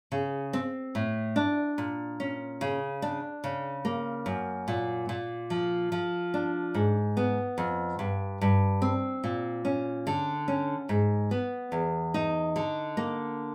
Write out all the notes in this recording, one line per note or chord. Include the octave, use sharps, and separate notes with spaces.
C#3
C4
A2
D4
A#2
C#4
C#3
D4
C#3
A#3
F#2
A#2
A#2
F3
F3
D4
G#2
B3
F2
G2
G2
C4
A#2
C#4
D3
C#4
G#2
B3
E2
D#4
D3
A#3